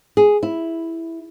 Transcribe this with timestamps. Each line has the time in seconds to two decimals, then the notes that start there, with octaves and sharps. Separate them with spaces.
0.17 G#4
0.43 E4